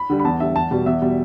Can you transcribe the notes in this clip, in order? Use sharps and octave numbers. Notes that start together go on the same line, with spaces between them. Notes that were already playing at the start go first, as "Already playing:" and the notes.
Already playing: B5
D3 G3
B5
E2 A5
D3 G3 E5
E2 A5
B2 G3
E2 E5
B2 G3